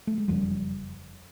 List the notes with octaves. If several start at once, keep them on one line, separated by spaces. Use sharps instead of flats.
A3
G#3
F#1 F2 C#3 F3 G3